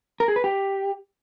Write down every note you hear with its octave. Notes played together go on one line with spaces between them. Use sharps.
A#4
G#4
B4
G4